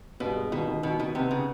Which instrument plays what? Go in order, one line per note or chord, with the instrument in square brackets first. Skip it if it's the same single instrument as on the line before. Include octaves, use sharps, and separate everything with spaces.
[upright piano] G2 [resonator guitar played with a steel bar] B2
[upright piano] G#3
[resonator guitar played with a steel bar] B2 [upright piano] D#3
[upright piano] D#3
[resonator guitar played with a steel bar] B2 [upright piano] D#3
[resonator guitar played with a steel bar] B2 [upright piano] D#3
[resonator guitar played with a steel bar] C3 [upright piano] B3
[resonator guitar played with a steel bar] C#3